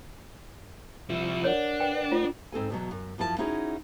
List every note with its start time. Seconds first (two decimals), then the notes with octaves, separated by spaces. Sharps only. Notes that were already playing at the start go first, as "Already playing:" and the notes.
1.10 C3 F3 E4 F4
1.44 D4 A#4 C#5 D5 F#5
1.80 B4 G5
2.12 A3 F4 C5 C#5
2.52 G#2 C4 A4 G#5
2.70 E2 B2 F#3
2.91 F#2
3.18 F#2 F3 E4 A4 A5
3.38 C#4 D#4 E4 F#4 G#4 C#5